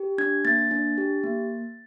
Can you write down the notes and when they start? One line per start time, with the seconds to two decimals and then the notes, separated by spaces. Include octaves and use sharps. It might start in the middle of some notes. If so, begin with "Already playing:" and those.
Already playing: G4
0.18 D4 G#6
0.45 A#3 A6
0.71 D4
0.98 G4
1.23 A#3